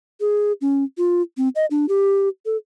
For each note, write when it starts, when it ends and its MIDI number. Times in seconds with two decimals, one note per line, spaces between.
0.20 0.52 68
0.61 0.84 61
0.98 1.22 65
1.37 1.49 60
1.56 1.66 75
1.71 1.86 62
1.89 2.29 67
2.46 2.57 69